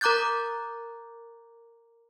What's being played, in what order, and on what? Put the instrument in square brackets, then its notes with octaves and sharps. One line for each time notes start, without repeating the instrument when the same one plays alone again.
[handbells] A#4 A#5 D6 F#6 G6 A6